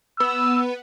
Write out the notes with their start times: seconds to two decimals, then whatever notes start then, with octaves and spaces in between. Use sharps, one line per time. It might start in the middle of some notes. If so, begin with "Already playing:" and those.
0.20 B3 E6